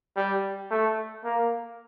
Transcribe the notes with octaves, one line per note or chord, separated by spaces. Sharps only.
G3
A3
A#3